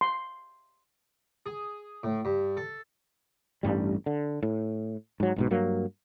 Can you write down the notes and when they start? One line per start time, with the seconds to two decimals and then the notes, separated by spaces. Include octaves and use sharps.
0.01 C6
1.46 G#4
2.03 A2
2.25 G2
2.57 A4
3.63 A1 G2 G3
4.06 D3
4.43 A2
5.20 G#2 F#3
5.36 B1 G#2 B2
5.51 G2 F#3 A#3